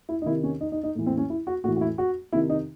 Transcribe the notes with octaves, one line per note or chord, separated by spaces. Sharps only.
E4
D#4
C3 D#3 E4
C#4
D#4
D#4
D#4
A2 E3
C4
C#4
E4
F#4
A2 E3 F#4
F#4
E4
F#4
C3 D#3 E4
D#4